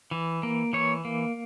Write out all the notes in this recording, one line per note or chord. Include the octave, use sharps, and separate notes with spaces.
E3
A#3
E3 C#5
A#3